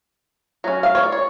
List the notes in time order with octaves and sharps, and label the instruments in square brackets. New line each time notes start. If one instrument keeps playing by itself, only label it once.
[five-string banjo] F#3 C#4
F5
C#5
D5
C#5